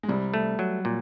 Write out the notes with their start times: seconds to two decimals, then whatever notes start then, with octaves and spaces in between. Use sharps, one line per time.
0.03 G#3
0.09 C2 G3
0.34 A3
0.59 F#3
0.85 A#2